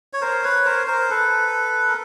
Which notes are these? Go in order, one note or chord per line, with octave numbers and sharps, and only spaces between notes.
C#5
A#4 C5
B4 C#5
A#4 C5
A#4 C5
A4 B4
A#4